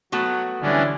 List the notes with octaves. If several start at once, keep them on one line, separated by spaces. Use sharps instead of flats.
F#3 A3 B3 F#4
D3 E3 G3 C#4 D4